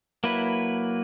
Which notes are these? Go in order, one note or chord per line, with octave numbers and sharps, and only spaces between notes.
F#3 A#3 E4 B4